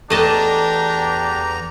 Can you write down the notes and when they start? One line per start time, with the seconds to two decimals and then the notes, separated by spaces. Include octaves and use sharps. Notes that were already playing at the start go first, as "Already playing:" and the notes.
0.10 E2 A3 D4 G4 D#5 A5 A#5